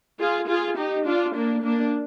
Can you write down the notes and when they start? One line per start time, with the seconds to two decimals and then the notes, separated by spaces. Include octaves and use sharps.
0.19 F4 G#4
0.49 F4 G#4
0.77 D#4 G4
1.06 D4 F4
1.35 A#3 D4
1.64 A#3 D4